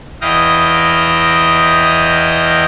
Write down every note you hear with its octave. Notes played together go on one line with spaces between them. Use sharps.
E2 E4 D#5 F5 G5 A#6